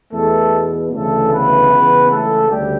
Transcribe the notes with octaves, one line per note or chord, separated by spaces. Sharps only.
E2 B2 A3 A4
D2 C#3 E3 A3 A4
B3 B4
C#2 C#3 E3
A3 A4
D2 C#3 G3 G4